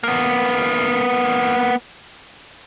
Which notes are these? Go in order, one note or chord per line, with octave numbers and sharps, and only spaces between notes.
A#3 B3